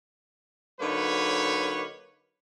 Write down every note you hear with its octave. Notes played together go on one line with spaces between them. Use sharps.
D3 F#3 A#3 D#4 B4 C#5